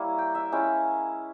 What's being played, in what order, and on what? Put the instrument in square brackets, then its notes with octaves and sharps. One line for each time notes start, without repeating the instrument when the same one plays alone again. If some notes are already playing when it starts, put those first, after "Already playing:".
Already playing: [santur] G3 A#3 E4 C#5
G5
E5
G#3 C#4 E4 G5